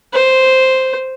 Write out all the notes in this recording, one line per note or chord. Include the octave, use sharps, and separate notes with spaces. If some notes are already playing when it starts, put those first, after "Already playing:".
C5